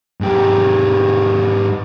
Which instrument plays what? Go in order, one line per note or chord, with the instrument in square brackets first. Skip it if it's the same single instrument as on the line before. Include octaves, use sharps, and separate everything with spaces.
[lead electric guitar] G#2 G4